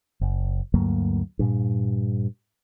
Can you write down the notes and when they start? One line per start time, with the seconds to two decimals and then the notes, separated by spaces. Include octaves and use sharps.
0.21 F#1
0.74 D2 G2 F#3 A#3
1.39 G2 A#2